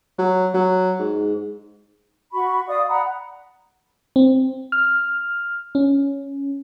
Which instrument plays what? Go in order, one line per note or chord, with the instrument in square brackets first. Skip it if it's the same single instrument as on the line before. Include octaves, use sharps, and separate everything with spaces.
[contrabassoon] F#3
F#3
G#2
[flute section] F#4 B5 C#6
D5 D#5 F5 D#6
F#5 A#5 B5
[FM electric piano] C4
F6
C#4